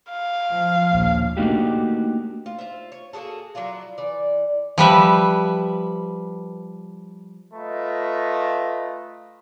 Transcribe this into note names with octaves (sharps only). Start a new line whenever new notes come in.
F5
F3
A#1 D#2
A3 A#3 D4 D#4 F#4 G4
F4
F4 C5 E5
C#5
A#3 F#4 G#4 A4
F#3 D4 E4 F4
E3 D5
F3 G3 B4 E5
A3 F4 B4 D#5 A#5